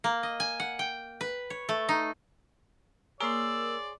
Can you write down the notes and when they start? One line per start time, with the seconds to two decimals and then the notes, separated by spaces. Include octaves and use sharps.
0.04 A#3
0.23 D#5
0.40 G#5
0.60 F#5
0.79 G5
1.21 B4
1.50 C#5
1.69 A3
1.89 D#4
3.20 A#3 G#4 A#4 C#5 D5 C6 E6